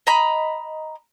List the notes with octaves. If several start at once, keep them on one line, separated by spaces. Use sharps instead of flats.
D#5 A#5 B5